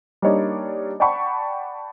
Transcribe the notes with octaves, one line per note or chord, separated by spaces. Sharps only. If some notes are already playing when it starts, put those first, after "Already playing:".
G3 A#3 D4 D#4 C#5 D5
D5 F#5 G5 A5 B5 C#6